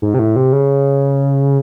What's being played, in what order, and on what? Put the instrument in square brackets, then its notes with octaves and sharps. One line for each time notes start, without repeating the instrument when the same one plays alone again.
[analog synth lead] G#2
C3
A2
C3
C#3